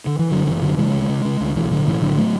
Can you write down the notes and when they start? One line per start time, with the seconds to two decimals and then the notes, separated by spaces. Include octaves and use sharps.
0.06 D3
0.19 E3
0.31 F#1 D3 F#3
0.47 F#1 E3
0.62 F#2 D3 F#3
0.78 C#3 E3 G#3
0.94 D2
1.09 C#3
1.25 C#3
1.41 D2
1.56 B1 E3
1.71 A2 D3 F#3
1.87 A2 E3
2.02 B1 D3 F#3
2.18 F#3 A3